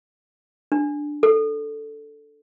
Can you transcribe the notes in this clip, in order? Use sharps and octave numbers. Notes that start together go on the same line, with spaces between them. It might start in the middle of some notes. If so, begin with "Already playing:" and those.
D4
A4